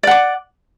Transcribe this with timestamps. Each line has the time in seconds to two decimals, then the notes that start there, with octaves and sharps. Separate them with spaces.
0.03 D5
0.07 F#5
0.11 D6